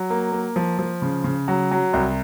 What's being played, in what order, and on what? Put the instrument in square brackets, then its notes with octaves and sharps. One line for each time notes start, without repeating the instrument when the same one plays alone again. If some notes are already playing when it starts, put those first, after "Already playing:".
Already playing: [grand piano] F#3
A#3
A#3
F3
F3
C#3
C#3
F#3
F#3
C2